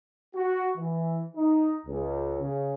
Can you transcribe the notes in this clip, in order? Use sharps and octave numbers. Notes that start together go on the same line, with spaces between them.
F#4
E3
D#4
C#2
C#3